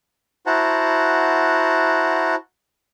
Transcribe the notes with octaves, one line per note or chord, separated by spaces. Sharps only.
E4 F#4 C5 F#5 A5 A#5